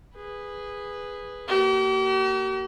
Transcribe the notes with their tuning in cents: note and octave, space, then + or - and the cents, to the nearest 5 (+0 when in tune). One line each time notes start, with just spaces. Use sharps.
G#4 -10 B4 +0
A#3 -20 G4 -45